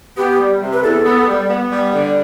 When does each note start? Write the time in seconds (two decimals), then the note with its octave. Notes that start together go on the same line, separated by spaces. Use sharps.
0.17 B3 G4
0.39 G3
0.61 C3
0.73 B4
0.83 E2 A4
1.05 B3
1.27 G3
1.49 B3
1.70 G3
1.92 D3